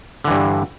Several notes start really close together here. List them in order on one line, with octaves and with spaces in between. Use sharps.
D3 E3 G2